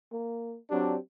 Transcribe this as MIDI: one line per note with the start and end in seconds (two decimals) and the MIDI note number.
0.12 0.58 58
0.71 0.95 54
0.71 0.95 60
0.71 0.95 62
0.71 0.99 67